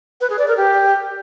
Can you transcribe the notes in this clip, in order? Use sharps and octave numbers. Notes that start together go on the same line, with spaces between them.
B4
G#4
D5
A#4
G4